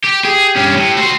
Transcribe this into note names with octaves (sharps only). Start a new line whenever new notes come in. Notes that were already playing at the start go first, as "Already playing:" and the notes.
G4
G4 G#4
G2 C#4 G4
A2
F#4 C5